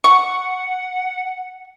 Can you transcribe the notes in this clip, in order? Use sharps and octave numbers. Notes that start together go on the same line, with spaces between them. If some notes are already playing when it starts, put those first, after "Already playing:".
F#5 C#6